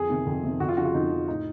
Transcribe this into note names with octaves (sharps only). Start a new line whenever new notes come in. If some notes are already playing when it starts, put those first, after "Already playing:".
Already playing: F2 G#4
C3 D#3
F2
C3 D#3
F2 F#4
F4
C#3 F3 F#4
F4
F2 D#4
C#3 F3
A2 D#4